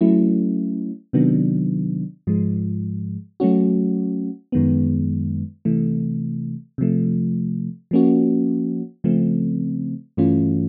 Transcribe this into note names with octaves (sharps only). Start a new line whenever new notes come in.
F#3 A3 C#4 E4
C3 D#3 F#3 B3 D4
G#2 F3 G#3
F#3 A3 C#4 F#4
F#2 D#3 G#3 B3
C3 E3 A3
C3 F3 A3
F3 A#3 C#4 F#4
C#3 F3 A3 C4
G2 E3 A3 C#4 F4